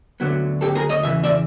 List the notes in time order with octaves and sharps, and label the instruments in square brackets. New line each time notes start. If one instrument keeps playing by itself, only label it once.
[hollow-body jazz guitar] D2 D3 F#3 B3
G4 A4
G#4 A#4
C#5 D#5
E2 C#3 E3 E5
D5 E5